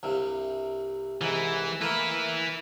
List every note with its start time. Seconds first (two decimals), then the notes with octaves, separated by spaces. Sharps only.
0.03 C2 G2 C3
1.21 C2 G#2 E3
1.81 A3 A#3 E4 B4